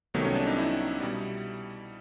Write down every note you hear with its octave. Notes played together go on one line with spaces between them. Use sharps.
C2 C3 D#3 F#3 A3 B3
C#4
D4
D#4
E4
B2 G3